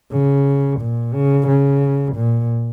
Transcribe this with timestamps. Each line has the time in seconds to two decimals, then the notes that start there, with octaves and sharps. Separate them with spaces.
0.12 C#3
0.80 A#2
1.14 C#3
1.47 C#3
2.16 A#2